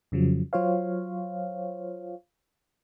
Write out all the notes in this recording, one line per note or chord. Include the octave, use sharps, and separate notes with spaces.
F2 C#3 F3 F#3
F#3 F4 C5 C#5 F5